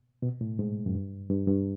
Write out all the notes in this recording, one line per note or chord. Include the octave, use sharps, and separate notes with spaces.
B2
A2
G#2
F#2
G2
G2
G2